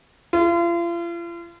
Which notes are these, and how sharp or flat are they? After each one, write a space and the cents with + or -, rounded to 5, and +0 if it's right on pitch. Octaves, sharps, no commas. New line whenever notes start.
F4 -40